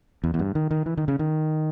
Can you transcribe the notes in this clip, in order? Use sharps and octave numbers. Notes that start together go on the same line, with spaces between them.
E2
E2
G2
D#3
D#3
E3
D#3
C#3
D#3